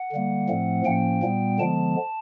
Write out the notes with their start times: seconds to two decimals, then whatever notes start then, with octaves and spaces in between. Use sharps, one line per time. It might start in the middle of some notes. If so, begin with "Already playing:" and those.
Already playing: F#5
0.12 D3 G3 A#3
0.49 A2 F3 A3 C4
0.85 A2 F3 A#3 C#4 G5
1.23 A#2 G3 B3
1.59 D3 F3 G#3 B3 A5